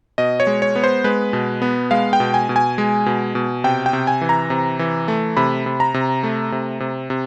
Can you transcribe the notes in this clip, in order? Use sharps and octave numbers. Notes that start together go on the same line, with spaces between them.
B2 D#5
C#5
G#3
C#5
B3
C5
G#3 B4
B2
B3
G#3 F5
G5
B2
G#5
B2
G#5
G#3
B2
B2
C3 G5
G5
C3
G#5
E3
A#5
C3
E3
A3
C3 B5
C3
A#5
C3
A3
C3
C3
C3